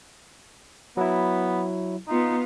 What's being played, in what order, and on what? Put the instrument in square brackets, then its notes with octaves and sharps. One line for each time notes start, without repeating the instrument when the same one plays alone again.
[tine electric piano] F#3 E4 [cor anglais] B3
[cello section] B3 F4 [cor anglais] D#4